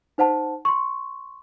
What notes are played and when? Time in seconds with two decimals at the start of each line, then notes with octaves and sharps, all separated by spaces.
0.18 D#4 C5 F#5 A5
0.65 C6 C#6